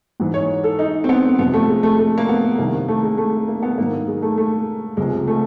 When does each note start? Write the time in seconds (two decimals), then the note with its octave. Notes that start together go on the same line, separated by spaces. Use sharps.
0.20 G#2 E3
0.34 C#5
0.64 A4
0.79 D#4
1.04 C4
1.09 B3
1.39 F2 C3 F3 B3
1.54 A3
1.69 G#3
1.83 A3
1.99 A3
2.18 A#3
2.29 B3
2.59 C2 C3 D#3 A#3
2.88 A3
3.03 G#3
3.18 A3
3.48 A#3
3.63 B3
3.78 G#2 D#3 F#3 A#3
4.08 G#3
4.22 A3
4.38 A3
4.97 C#2 C3 F3 G#3
5.28 A3